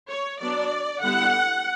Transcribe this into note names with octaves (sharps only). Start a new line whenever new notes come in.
C#5
F#3 B3 D4 D5
D3 G3 B3 E4 F#5